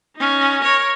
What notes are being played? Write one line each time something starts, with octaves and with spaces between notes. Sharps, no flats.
C#4 D#4
A#4 C#5